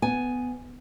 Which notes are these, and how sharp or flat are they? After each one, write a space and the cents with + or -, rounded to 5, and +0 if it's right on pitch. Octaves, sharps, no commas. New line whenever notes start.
B3 +15 G#5 +0